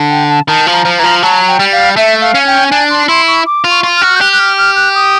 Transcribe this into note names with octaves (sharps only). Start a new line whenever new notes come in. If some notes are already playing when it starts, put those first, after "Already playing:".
Already playing: D3
G5
A5
D#3 A5
F3
A#5
F3
E3 A#5
F3
F#3 A5
G5
G3
F5
A3 E5
F5
C#4
G5
D4 G#5
C6
E4 C6
C#6
D6
F4
C#6
F4
F6
F#4
G6
G4 F#6
F#6
F6
F6
F#6
D#6